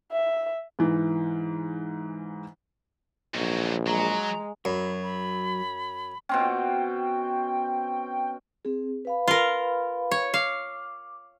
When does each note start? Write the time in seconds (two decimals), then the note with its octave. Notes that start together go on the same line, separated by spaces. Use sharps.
0.12 E5
0.79 G#2 E3
3.35 A#1 G#2 F#3
3.87 F#3 G#3 A#5
4.65 F#2 F#3 B5
5.02 B5
6.29 B2 C4 C#4 G5
8.65 C4 G#4
9.05 B4 F5 B5
9.28 F4 A#4
10.11 C#5
10.34 F5 D6